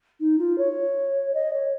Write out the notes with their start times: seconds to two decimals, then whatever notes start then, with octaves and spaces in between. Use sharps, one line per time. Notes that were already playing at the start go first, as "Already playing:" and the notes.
0.20 D#4
0.39 F4
0.58 C#5
1.34 D#5
1.53 C#5